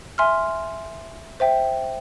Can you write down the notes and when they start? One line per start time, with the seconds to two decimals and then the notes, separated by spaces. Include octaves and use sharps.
0.18 E5 G#5 C6 F6
1.40 C5 E5 G5